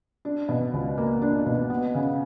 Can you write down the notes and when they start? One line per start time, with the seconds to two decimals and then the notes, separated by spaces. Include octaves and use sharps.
0.25 D4
0.49 B2
0.73 C#2
0.98 A#3
1.22 D4
1.46 B2
1.70 B3
1.95 C#3